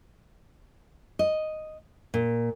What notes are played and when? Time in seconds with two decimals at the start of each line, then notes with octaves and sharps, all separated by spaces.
1.19 D#5
2.14 A#2